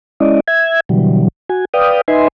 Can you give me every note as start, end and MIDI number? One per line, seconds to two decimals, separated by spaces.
0.20 0.40 56
0.20 0.40 61
0.20 0.40 64
0.20 0.40 74
0.20 0.40 75
0.48 0.80 76
0.48 0.80 92
0.89 1.28 47
0.89 1.28 50
0.89 1.28 52
0.89 1.28 54
0.89 1.28 55
1.49 1.65 66
1.49 1.65 80
1.74 2.01 71
1.74 2.01 74
1.74 2.01 77
1.74 2.01 79
1.74 2.01 87
2.08 2.28 63
2.08 2.28 71
2.08 2.28 75
2.08 2.28 76
2.08 2.28 80
2.08 2.28 84